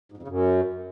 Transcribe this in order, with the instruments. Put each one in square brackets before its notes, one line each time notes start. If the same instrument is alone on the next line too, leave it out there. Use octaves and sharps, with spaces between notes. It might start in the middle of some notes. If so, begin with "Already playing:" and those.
[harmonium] G#2
F2
C#3
F#2